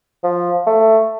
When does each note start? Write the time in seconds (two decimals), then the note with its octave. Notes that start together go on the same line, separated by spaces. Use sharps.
0.24 F3
0.67 A3